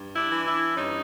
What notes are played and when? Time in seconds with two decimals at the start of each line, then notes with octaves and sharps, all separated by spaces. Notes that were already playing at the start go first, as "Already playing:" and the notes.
Already playing: G2
0.16 D4 E4
0.31 E3
0.46 D4 E4
0.76 G2 C#4 D#4